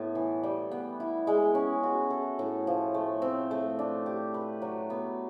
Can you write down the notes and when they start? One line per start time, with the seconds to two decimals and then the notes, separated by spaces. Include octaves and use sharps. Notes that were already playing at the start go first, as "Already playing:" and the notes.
Already playing: A2 B3
0.15 E3
0.43 G3
0.71 B3
1.00 E4
1.27 G#3
1.55 C#4
1.83 F#4
2.10 A4
2.39 A2
2.67 F3
2.94 A3
3.22 C4
3.51 A3
3.79 D4
4.06 G4
4.34 B4
4.62 F#3
4.90 B3